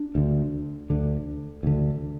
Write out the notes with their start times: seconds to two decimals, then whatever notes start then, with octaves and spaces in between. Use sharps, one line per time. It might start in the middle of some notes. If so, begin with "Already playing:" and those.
Already playing: D4
0.15 D2 D3
0.90 D2 D3
1.63 D2 D3